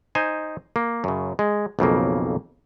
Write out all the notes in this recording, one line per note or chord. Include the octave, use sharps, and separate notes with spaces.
D#4 C5 G#5
A#3
F#2 C#3
G#3
B1 F2 C#3 A#3